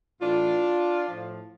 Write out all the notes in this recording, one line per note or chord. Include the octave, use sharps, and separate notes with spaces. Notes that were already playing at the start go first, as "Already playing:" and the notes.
A2 E3 D4 F4
A2 F3